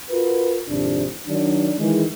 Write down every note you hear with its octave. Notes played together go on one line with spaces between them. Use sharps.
F4 F#4 A#4 B4
G#1 F2 C3 D4
D#3 F#3 D4
D#3 E3 G#3